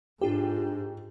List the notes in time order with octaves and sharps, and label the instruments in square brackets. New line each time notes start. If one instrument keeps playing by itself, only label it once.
[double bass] G#2 [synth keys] D4 F4 A4 [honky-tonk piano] G4